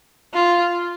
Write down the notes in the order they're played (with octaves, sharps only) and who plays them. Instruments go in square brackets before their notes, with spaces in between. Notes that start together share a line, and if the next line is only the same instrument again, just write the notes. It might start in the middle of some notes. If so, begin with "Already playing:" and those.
[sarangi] F4